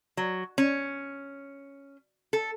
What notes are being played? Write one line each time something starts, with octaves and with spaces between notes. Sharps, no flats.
F#3
C#4
A4